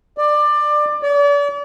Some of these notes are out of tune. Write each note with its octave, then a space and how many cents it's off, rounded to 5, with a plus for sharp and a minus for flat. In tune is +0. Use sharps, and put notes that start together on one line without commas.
D5 +20
D5 -40